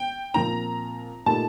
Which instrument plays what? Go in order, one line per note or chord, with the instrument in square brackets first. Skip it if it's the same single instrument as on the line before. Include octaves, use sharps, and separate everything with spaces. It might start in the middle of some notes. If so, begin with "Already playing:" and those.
Already playing: [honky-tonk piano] G5
[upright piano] A#2 F3 C4 F4 [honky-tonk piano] A#5
[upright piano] A#2 A3 D#4 G4 [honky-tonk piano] A5